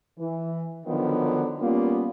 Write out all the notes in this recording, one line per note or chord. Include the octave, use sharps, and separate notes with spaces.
E3
D3 D#3 F3 F#3 B3
G3 A#3 B3 C#4 F4